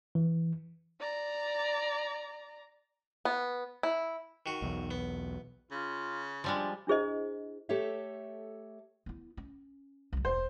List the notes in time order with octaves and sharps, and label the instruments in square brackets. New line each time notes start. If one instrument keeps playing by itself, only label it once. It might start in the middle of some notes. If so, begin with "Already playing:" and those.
[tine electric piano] E3
[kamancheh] D5 A#5
[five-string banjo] B3
E4
[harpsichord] D#3 F#4
[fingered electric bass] B1 E2
[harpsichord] B3
[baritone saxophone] C#3 [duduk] F4
[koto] F3 G3 G#3 [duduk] D4
[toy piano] D4 E4 G#4 C5 D#5
[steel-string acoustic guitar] A3 G4 A4 C#5 E5
[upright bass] B3 E4
C#4
C2 F#3
[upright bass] E1 [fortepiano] C5